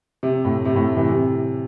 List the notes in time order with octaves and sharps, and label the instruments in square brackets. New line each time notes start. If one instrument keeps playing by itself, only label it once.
[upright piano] C3
A2
C3
A2
C3 E3
C3